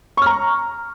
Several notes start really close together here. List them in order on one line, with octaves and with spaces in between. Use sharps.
C#6 F6 A#5